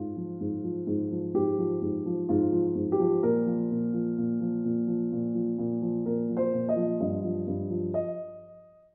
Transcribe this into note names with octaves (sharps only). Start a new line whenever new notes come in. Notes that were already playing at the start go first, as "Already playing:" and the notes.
Already playing: G#2 F4
F3
G#2
F3
G#2
F3
G#2 G4
F3
G#2
F3
G#2 F4
F3
G#2
G4
F3
A#2 A#4
F3
A#2
F3
A#2
F3
A#2
F3
A#2
F3
A#2
F3
A#2 A#4
F3
C5
A#2
D#5
F3
G2 D#5
F3
G2
F3
D#5